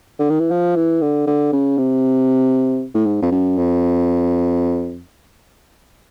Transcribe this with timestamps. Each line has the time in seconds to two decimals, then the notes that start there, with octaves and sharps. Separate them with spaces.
0.19 D3
0.30 D#3
0.40 E3
0.51 F3
0.76 E3
1.01 D3
1.27 D3
1.53 C#3
1.78 C3
2.95 A2
3.06 G#2
3.23 F2
3.32 F#2
3.58 F2